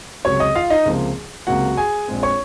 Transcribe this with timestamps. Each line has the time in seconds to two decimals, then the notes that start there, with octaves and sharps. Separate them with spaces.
0.25 C#2 C3 F#3 C#5 C#6
0.40 D#5 D#6
0.55 F4 F5
0.70 D#4 D#5
0.86 C#2 C3 F3 A#3
1.47 C#2 C3 F#3 A#3 F#4 F#5
1.77 G#4 G#5
2.08 A#1 A#2 G#3 C4
2.23 C#5 C#6